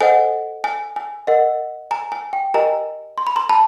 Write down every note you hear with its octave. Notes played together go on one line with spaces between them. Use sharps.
A4 C5 D#5 F#5 G#5
G#5
G#5
A#4 D#5 F#5
G#5 A#5
G#5
G5
G4 A#4 D#5 G5 G#5 A#5
C6
B5
A#5 C6
A5 B5